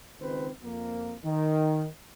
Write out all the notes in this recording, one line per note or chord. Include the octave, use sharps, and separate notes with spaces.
G#1 C#2 D#3 C4 B4 C5
F2 A#3
D#3